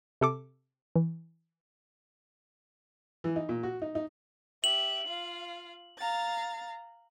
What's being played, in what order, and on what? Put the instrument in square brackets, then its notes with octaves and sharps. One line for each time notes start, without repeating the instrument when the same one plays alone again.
[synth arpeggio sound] C3 A4 D6
E3
[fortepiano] E3
D#4
A#2
F#4
D#4
D#4
[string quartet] G4 E5 [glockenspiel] F#7
[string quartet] F4 F5
F5 A#5 A6